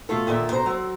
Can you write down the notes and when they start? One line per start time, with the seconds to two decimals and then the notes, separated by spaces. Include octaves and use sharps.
0.09 B2 A3 F4 A4
0.27 D#2 A#2 D3 E5
0.52 B2 C5 A#5
0.66 F#3 C4